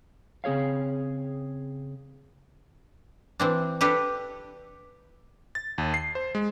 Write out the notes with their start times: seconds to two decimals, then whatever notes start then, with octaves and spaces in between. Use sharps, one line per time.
0.44 C#3 C4 G#4 C#5 F5
3.40 E3 C4 D4
3.81 D4 G4 A4 B4
5.55 A6
5.78 D#2
5.94 C7
6.15 C5
6.35 G#3